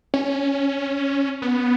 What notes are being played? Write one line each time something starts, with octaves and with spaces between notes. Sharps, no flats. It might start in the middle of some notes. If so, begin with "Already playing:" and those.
C#4
B3